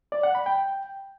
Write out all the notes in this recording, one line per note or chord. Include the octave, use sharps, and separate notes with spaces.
D5
F#5
B5
G5